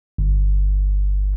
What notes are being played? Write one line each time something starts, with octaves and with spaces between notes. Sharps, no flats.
G1